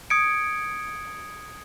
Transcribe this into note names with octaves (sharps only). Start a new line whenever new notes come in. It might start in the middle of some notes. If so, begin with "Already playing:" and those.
D#6 G#6 C#7 D7